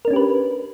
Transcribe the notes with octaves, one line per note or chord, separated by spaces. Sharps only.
C#4 D4 G4 A#4 B4